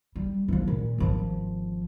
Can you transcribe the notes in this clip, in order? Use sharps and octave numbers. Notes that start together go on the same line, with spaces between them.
G3
E3 F3
A#2
G#1 F3